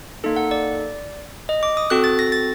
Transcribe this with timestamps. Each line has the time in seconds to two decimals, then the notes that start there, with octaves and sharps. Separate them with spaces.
0.24 A#3 D#4 A4
0.36 F#5
0.51 D5
1.49 D#5
1.63 D6
1.77 D#6
1.90 C4 F#4 A4 F#6
2.04 A6
2.19 A#6
2.32 A6